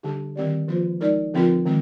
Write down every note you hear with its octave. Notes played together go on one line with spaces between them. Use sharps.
D3 G3 D4 G4
D#3 G3 C4 G4 D5
F3 A#3 F4 C5
G#3 D#4 A#4 D5
D3 F3 C4 F4 A#4
D#3 G#3 C4